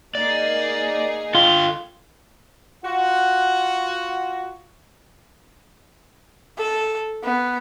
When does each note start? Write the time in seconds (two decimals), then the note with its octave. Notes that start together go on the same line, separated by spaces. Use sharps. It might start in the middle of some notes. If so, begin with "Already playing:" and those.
0.15 A#3 D#4 G#4 D5
1.35 D3 F4 A4 G5
2.84 F4 F#4 F#5
6.58 A4
7.24 B3